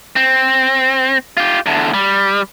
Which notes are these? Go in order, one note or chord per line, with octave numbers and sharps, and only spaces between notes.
C4
F4 G4
E2 D3
G3